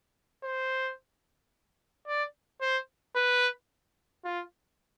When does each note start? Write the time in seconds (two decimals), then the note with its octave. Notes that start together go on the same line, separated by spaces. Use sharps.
0.44 C5
2.07 D5
2.61 C5
3.16 B4
4.25 F4